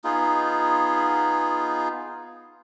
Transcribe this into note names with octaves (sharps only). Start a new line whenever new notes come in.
B3 D#4 F4 G#4